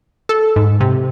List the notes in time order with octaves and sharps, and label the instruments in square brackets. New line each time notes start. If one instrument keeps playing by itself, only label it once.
[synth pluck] A4
G#2
C3